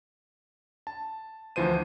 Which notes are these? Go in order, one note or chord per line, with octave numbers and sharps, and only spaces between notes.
A5
D2 E3 F3 C5 D#7